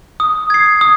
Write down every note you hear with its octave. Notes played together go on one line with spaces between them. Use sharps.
D#6
G#6 C7
D#6